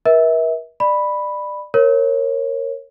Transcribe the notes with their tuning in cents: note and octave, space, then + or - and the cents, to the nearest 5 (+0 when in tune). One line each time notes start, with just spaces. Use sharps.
A#4 +45 E5 -30
D5 +25 B5 +0
A#4 +0 C#5 -25